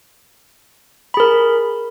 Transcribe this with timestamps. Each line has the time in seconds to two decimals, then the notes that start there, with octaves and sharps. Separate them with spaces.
1.14 B5
1.17 G#4
1.20 A#4